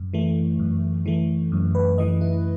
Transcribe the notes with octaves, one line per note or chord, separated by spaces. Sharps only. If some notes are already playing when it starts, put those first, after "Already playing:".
Already playing: F#2
E3 A3
F#2
E3 A3
F#2
B4
E3 A3 D#5
E4